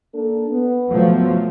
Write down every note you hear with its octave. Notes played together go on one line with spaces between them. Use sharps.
A#3 D4 A4
B3
F3 F#3 A3